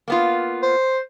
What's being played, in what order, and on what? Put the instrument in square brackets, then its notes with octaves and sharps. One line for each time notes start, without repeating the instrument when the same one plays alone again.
[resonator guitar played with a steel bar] A#3 B3 F4
[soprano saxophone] C5